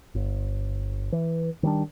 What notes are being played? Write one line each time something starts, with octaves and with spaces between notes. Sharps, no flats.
G1
E3
D#3 G3 D4